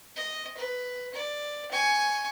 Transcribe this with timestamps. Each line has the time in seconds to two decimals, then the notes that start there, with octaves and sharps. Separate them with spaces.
0.17 D#5
0.57 B4
1.14 D5
1.71 G#5 C#6